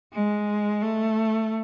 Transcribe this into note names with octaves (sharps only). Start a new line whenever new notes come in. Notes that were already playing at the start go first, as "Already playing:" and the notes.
G#3
A3